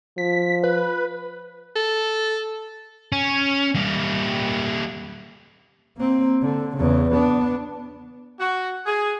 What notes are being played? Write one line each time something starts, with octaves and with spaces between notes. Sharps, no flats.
F3 B6
B4
A4
C#4
G3 A#3
A#3 C4
D3
E2 C#3
B3 D4
F#4
G#4